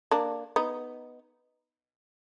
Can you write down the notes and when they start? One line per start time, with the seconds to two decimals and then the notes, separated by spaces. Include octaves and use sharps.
0.11 A#3 D4
0.56 B3 D#4